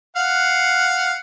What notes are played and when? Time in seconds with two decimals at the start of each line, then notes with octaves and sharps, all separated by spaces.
0.16 F5 F#5